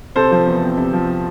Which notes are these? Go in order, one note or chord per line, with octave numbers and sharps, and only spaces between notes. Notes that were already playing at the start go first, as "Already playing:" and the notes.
C3 A4 C5
F3
E2
C4
C3
F3